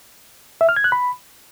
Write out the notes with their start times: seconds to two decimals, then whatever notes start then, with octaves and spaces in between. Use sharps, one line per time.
0.61 E5
0.69 F6
0.76 G#6
0.84 F#6
0.92 B5